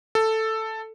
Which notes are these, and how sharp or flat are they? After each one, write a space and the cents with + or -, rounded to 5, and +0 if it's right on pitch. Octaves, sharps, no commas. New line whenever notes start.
A4 +5